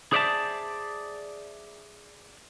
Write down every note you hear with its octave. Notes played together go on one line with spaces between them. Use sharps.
G#4 C5 D5 E5 F5 A5